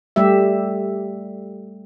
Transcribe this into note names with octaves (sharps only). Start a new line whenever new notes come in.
G3 A3 G4 E5